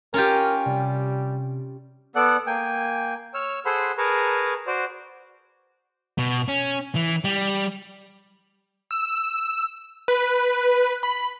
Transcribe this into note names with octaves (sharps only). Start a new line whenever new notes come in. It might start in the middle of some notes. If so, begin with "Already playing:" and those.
C#4 F4 G4 A#4
C3 G3
B3 A4 D5 F#5 F#6
A#3 G5 G#5
C#5 E6 F6
G#4 A4 C5 F#5 B5 C6
G#4 A#4 B4 A5 A#5 C#6
F#4 C5 D5
B2
C#4
E3
G3
E6
B4
B5